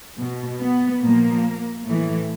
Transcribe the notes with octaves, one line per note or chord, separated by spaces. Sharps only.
B2
B3
A#2 F3 A#3
A2 E3 A3